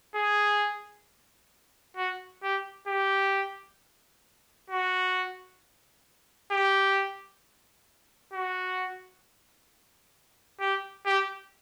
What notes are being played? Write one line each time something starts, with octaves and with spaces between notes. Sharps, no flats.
G#4
F#4
G4
G4
F#4
G4
F#4
G4
G4